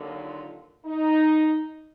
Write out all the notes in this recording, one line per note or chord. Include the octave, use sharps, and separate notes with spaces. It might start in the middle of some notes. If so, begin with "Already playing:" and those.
Already playing: D#2 D3 F#3
F4
D#4